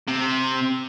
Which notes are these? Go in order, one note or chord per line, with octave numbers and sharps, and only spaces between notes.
C3